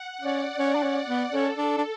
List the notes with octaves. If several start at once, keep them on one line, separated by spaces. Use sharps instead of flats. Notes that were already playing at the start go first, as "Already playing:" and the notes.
Already playing: F#5
C#4 D5
C#4
D4
C#4
B3
C#4 A4
D4
D4